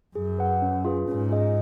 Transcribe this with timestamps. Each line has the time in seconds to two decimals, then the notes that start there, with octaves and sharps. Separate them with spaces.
0.15 F#2 G#4
0.39 B4 F#5
0.62 C#4
0.85 F4 G#4 B4
1.08 G#2 C#4
1.30 F4 G#4 D#5